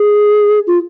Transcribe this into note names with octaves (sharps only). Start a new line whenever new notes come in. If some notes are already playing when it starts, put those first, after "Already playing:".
Already playing: G#4
F4